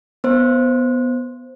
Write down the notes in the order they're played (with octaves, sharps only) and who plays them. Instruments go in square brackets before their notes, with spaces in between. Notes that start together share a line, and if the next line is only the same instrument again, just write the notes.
[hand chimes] B3 C5